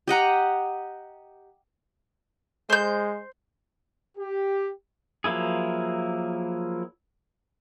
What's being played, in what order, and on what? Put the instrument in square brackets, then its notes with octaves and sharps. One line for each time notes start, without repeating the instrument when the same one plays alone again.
[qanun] G4 D#5 F#5 A#5
[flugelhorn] G#3 [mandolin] C5 G6
[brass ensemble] G4
[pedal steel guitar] F3 F#3 A#3 E4 G#4